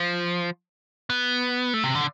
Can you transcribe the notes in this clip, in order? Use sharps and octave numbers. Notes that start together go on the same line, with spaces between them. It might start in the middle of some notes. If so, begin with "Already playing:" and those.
Already playing: F3
B3
A3
C3
D3